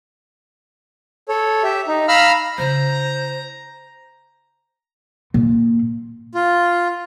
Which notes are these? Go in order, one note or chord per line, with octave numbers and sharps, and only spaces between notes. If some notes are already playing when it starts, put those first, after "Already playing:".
A4 C#5
G4 E5
D#4
F5 A#5 B5 E6 F6
C#3 E4 C5 A#5
A#2
F4